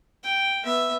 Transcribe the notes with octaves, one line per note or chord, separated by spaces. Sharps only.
G5
B3 E5